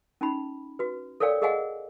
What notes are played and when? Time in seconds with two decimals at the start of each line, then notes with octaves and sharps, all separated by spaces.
0.21 C#4 D#4 B5
0.79 F#4 B4
1.20 A4 A#4 C#5 D5 F5 G5
1.42 G#4 A#4 D#5 F5 F#5 G#5